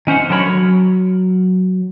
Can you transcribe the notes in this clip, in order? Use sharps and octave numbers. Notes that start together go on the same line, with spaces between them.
D#3 C#4 C5 F#5
D3 F#3 A#4 C#5 B5
F#3